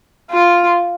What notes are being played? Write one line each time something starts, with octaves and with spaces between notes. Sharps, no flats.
F4